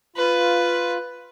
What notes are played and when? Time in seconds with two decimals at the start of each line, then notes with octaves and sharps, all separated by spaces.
0.16 F4 B4